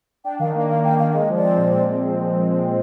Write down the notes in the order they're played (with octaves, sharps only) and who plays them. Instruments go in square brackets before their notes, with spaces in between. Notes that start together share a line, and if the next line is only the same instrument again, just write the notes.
[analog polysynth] D4 [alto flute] G5
[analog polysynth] D#3 [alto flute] F5
[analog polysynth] A#3
[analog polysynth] A#3 [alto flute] F5
[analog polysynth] A#3 [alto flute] G5
[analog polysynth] D#3 [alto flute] F5
[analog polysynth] G#3 [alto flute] D#5
[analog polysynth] F3
[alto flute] D5
[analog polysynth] C4
A#2
A#2